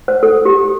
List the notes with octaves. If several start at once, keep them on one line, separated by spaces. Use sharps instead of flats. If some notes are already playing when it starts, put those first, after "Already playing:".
C5
A4
G4